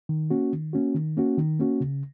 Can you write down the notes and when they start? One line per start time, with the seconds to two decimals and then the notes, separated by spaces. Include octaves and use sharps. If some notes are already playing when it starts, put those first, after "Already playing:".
0.09 D#3
0.30 A#3 C#4 F#4
0.53 D#3
0.73 A#3 C#4 F#4
0.95 D#3
1.17 A#3 C#4 F#4
1.38 D#3
1.59 A#3 C#4 F#4
1.81 C#3